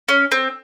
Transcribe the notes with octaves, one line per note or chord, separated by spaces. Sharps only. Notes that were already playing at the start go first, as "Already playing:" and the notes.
C#4
C4